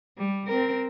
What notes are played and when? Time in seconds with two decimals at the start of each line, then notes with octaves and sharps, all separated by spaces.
0.17 G3
0.47 C4 A#4